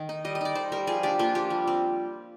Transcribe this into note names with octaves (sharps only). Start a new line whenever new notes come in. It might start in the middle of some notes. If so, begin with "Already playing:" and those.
Already playing: D#3
D#4
G3 D#5
D#5
D#4 D5
D#4 C5
G3 A#4
F3 G#4
D4 G4
A#3 F4
F3 G4
G3
C4